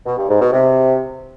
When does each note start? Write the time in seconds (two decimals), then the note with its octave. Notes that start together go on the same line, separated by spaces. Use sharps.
0.06 B2
0.17 G2
0.29 G#2
0.41 B2
0.52 C3